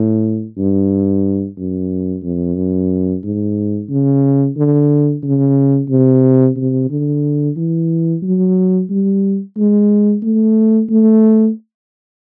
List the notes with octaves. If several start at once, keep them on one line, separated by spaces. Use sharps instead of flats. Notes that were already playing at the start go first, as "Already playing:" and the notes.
Already playing: A2
G2
F#2
F2
F#2
G#2
C#3
D3
C#3
C3
C3
D3
E3
F#3
G3
G#3
A3
A3